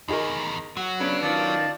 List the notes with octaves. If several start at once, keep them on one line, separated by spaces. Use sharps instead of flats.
E2 D#3 D#4 G#4 A#4
F#3 F#4
C#3 B3 D4 B4 C#5
D#3 F4 D5 A5